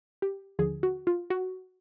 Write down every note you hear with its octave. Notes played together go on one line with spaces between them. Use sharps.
G4
D#2 D3 F3 G#4
F#4
F4
F#4